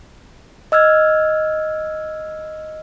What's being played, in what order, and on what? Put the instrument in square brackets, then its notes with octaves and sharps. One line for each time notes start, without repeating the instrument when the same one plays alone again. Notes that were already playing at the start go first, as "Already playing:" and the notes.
[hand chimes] D#5 E6 F6 G#6